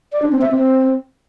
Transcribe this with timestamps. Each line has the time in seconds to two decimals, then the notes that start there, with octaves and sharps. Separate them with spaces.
0.13 D5
0.22 D4
0.32 C4
0.41 E5
0.51 C4